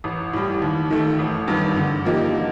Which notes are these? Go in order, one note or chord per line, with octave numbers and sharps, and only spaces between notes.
A1
A2 G3
D#2
D#3 A3
A1
G2 D#3
D3
F3 A#3 D#4 G4